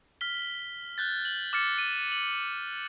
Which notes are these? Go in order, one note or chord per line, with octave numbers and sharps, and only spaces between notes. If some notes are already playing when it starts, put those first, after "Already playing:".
F6 B6 G7
F#6 G6 A6
F#7
D6 F6 A6 C#7
D#7
F#7